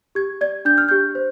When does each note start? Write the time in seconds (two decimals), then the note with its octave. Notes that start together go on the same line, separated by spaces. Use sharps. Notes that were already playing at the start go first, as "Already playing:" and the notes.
0.15 G4 G#6
0.41 D5 G#6
0.65 D4 G6
0.78 F6
0.89 G4 G6
1.15 C5